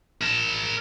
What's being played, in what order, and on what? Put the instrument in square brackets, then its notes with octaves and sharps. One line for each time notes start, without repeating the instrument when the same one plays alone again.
[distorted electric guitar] A#4 A5